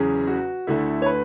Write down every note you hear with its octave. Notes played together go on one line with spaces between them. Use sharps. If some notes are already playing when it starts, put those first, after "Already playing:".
Already playing: E2 C#3 F#3 C#4 G#4
F#4
D2 D3 A3 E4
C#5
B4